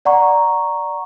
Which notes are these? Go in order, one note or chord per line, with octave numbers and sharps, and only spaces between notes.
D5 F#5 A#5 C#6